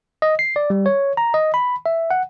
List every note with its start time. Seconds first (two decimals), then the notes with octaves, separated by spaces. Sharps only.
0.22 D#5
0.39 C7
0.56 D5
0.70 G3
0.86 C#5
1.17 A#5
1.34 D#5
1.54 B5
1.86 E5
2.11 F#5